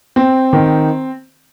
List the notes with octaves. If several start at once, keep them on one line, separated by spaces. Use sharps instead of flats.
C4
D#3